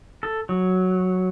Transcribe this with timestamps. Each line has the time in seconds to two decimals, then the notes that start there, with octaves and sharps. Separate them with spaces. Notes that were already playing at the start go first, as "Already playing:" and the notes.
0.23 A4
0.49 F#3